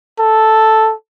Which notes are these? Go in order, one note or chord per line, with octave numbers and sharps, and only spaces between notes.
A4